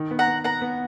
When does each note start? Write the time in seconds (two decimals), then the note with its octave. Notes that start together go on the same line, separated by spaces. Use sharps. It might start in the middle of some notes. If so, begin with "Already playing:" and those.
Already playing: D#3
0.11 B3
0.19 F#5 A#5
0.27 B3
0.44 B3 F#5 A#5
0.61 B3